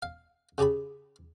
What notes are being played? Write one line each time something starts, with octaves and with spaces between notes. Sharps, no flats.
F5
C#3 G4 G#4 A5 B5